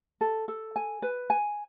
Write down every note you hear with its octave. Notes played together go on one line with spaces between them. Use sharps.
A4
A4
G#5
B4
G#5